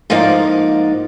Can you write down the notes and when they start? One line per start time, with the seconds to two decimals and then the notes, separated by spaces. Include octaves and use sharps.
0.10 G#2 F3 A#3 D#4 D5 F5